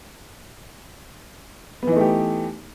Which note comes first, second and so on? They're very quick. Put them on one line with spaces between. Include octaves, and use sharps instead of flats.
B3 E3 D#4 A3 G4